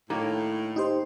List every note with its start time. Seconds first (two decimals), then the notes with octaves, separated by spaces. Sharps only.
0.10 A2 D#3 A#3
0.76 D#4 G4 C5